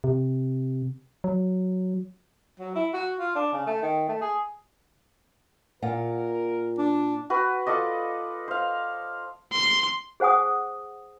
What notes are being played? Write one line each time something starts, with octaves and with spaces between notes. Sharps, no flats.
C3
F#3
F#3
E4
F#4
F4
D4
C#3
A3
D#3
A3
G#4
A#2 F4 A#4 F#5
D4
F#4 B4
F4 A4 D5 D#5
C5 F5
C6
G#4 C5 F#5 G#5 D#6